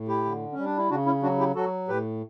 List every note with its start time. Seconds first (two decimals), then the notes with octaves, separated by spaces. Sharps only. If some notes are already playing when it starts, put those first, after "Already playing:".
Already playing: A2
0.08 E4 G4
0.25 D3
0.52 C#4
0.58 G3
0.65 D4
0.77 E4
0.90 C#3 D4 F#4
1.06 C#4 E4
1.22 F#3 D4 F#4
1.39 E4 G4
1.55 F#3 F#4 A4
1.88 A2 G4 B4